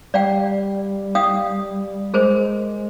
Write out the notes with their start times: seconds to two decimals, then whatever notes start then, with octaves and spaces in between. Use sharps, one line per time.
0.14 G3 D5 F5 G5
1.15 F5 G5 D#6
2.14 G#3 G#4 A#4 C5